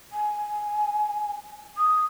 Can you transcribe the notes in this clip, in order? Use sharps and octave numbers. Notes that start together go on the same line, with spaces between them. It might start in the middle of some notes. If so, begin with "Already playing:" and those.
G#5
D#6